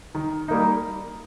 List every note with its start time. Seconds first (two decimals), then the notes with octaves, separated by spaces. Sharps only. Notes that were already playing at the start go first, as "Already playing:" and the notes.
0.15 D#3
0.48 G3 A#3 D#4